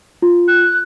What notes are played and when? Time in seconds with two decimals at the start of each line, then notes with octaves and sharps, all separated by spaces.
0.22 F4
0.48 F#6